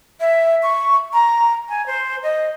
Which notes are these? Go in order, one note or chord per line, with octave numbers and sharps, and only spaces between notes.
E5
C#6
A#5
G#5
C5
D#5